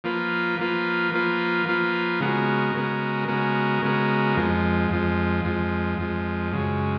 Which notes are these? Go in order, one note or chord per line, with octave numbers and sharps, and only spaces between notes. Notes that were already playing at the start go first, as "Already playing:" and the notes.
F3 A#3 F4 B4
F3 A#3 F4 B4
F3 A#3 F4 B4
F3 A#3 F4 B4
C#3 G#3 B3 F#4 A#4
C#3 G#3 B3 F#4 A#4
C#3 G#3 B3 F#4 A#4
C#3 G#3 B3 F#4 A#4
F2 F3 G#3
F2 F3 G#3
F2 F3 G#3
F2 F3 G#3
F#2 C#3 G#3